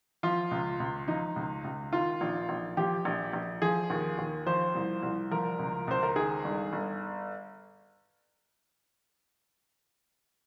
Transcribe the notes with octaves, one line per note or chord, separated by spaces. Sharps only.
F3 F4
C#2
C#2
F3 D#4
C#2
C#2
D#3 F4
A#1
A#1
F3 G4
A#1
A#1
F3 G#4
D#2
D#2
F3 C5
C2
C2
F3 A#4
C#2
C#2 C5
A#4
D#3 G#4
G1
G1